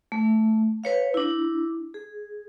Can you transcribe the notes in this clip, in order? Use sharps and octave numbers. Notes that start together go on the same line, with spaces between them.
A3
B4 C#5 F5
D4 E4
G#4